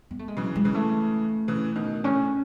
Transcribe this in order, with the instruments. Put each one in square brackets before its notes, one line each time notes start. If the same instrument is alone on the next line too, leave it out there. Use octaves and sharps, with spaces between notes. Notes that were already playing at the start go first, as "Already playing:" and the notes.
[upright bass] B3
A3
G#3
[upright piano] C#3 E3 [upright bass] F#3
[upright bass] G#3
[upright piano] C#3 E3
[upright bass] A3
[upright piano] C#3 E3
B2 D#3
[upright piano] A2 C#3 [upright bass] C#4